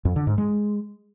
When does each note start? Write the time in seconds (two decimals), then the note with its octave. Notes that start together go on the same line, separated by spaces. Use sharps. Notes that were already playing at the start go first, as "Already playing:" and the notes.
0.05 F2
0.16 D3
0.27 G#2
0.38 G#3